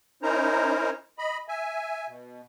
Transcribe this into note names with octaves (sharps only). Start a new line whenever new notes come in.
C#4 D#4 E4 A#4 C5 A#5
D#5 B5
E5 G#5
B2